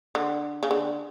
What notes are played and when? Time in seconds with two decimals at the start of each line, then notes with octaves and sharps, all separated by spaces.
0.15 D3
0.63 C#3
0.71 D3